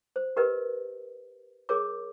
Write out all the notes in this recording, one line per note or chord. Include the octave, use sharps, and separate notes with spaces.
C5
G4 A#4 B4 D#5
G#4 A#4 C#5 D6